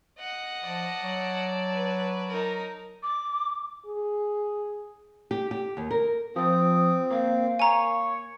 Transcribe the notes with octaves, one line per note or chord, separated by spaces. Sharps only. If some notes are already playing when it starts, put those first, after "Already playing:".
D#5 F#5
F3 D5 A5
F#3
B4
D#4 A#4
D6
G#4
G4
G4
D#2
A#4
F3 C4 D#6
A#3 F5
C#5 G#5 A#5